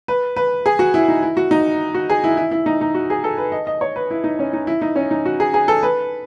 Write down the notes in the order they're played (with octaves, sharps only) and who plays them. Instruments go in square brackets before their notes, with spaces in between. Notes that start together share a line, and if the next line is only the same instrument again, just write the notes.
[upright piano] B4
B4
G#4
F#4
E4
D#4
E4
F#4
D#4
F#4
G#4
E4
E4
E4
D#4
D#4
F#4
G#4
A4
B4
D#5
D#5
C#5
B4
E4
D#4
C#4
D#4
E4
D#4
C#4
D#4
F#4
G#4
G#4
A4
B4